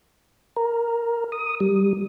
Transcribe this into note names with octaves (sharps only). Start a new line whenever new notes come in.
A#4
D#6
G3